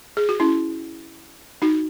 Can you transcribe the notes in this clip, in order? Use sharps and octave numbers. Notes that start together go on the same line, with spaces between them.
G#4
F#4
C#4 E4
D#4 F#4